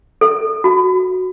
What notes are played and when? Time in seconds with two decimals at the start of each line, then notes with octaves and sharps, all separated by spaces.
0.21 A4
0.64 F#4